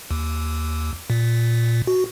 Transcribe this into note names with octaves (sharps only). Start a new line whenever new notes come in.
D#2
A#2
F#4